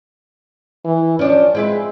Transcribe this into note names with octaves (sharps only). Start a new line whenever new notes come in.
E3
F3 C#4 D4
G#3 C4 E4 B4